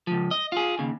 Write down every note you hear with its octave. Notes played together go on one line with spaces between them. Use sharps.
C#2 F3
D#5
F4 G#4
D#2 C#3